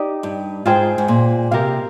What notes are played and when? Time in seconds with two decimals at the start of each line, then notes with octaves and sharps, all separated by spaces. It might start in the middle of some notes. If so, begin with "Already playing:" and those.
Already playing: D#4 G4 D5
0.23 G2
0.65 G#2 F4 G#4 C5 G5
0.98 G#2
1.08 A#2
1.51 C3 G4 A#4 F5